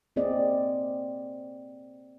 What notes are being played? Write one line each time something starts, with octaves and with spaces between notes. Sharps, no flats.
A#3 C4 G#4 D5 D#5